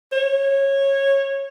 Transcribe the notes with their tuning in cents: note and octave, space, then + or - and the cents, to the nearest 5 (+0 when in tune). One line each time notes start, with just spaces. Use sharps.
C#5 -15